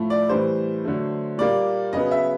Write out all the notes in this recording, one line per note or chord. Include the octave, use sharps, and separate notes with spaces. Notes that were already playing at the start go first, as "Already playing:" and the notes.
Already playing: A2 F3 A3
D5
A2 E3 G3 C5
D3 F#3 A3
A#2 G3 A#3 D5
C#3 F#3 B3 D#5
E5